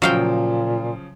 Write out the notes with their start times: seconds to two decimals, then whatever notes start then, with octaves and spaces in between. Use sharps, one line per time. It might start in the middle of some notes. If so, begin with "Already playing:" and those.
0.02 A#2 C#3 F3 F#3 F5 G5